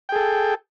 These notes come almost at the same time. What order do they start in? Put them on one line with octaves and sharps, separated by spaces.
G5 G#4 A4